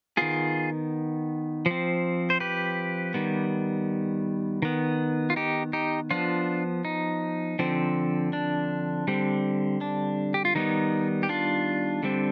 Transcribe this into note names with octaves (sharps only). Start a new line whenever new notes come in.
D#3 B3 F4 G#4
F3 C4
C5
G4 B4
D#3 G3 B3
D#3 B3
F4
D#4 G4
D#4 G4
F3 B3 D4 F4
D#4
D3 F3 C4
D4
D3 G3 C4
D4
G4
F4
D#3 G3 B3 D#4
G4
D4 F4
D3 G3 C4